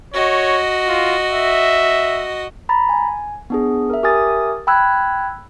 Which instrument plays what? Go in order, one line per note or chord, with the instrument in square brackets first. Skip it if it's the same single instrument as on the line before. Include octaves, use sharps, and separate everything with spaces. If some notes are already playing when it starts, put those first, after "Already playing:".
[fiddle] F#4 D#5 [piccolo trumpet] C#5
[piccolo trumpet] F4
E5
[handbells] A#5 B5 A6
G#5
B3 D4 G#4
A#4 E5
G4 A#4 E5 G#5 D#6 A6
G5 B5 E6 F#6 G#6